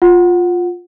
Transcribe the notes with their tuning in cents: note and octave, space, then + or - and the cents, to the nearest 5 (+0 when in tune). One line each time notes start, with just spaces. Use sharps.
F4 +10 F#5 +0